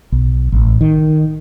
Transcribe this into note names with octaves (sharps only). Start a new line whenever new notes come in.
B1
A1
D#3